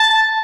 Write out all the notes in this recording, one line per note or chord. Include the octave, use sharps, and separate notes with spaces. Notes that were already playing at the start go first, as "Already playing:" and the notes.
Already playing: A5